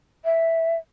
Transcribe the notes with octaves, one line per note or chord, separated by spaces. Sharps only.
E5